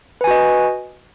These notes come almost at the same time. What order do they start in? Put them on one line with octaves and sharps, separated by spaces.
B4 G#5 F#4 D#5